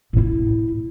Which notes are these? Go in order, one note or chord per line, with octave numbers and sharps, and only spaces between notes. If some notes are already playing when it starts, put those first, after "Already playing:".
A2 E4